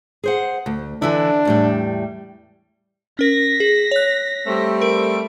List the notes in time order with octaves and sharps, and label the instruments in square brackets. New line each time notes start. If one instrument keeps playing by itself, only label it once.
[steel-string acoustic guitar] G#4 C5 F#5
D2
[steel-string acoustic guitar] D3 E3 E4 [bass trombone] D4
[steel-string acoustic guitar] E2 A2 G3
[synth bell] C#4 A#4 [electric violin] A#6 B6
[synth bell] G#4
C#5 F#6
[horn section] G3 A3 C4
[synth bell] A#4 [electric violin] D7